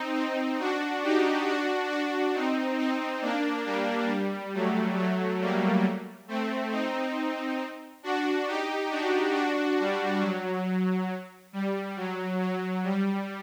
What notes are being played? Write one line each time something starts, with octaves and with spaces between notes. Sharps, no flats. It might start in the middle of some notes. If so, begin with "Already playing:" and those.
Already playing: C4 D#4
C4 D#4
D4 F#4
D#4 G4
D4 F#4
D4 F#4
C4 D#4
C4 D#4
A#3 D4
G3 A#3
G3
F#3 A3
F#3 A3
G3 A#3
A3 C4
C4 D#4
D4 F#4
D#4 G4
D4 F#4
D4 F#4
G3
F#3
G3
F#3
F#3
G3